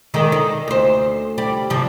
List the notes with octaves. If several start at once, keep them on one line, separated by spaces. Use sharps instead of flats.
D3 D#3 G#3
D#4
D2 C5
G3 D5
G2 C3 F3